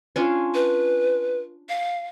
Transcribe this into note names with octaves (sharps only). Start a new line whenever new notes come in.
C#4 D4 F4
B4
F5